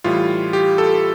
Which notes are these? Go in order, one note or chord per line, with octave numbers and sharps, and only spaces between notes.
A2 E3 G3 F4
G4
A4